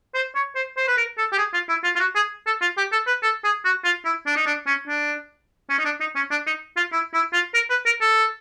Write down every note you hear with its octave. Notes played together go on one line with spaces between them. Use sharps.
C5
C#5
C5
C5
B4
A#4
A4
G4
G#4
F4
E4
F4
F4
F#4
G#4
A4
F4
G4
A4
B4
A4
G#4
F#4
F4
E4
D4
D#4
D4
C#4
D4
C#4
D#4
D4
D#4
C#4
D4
D#4
F4
E4
E4
F4
A#4
B4
A#4
A4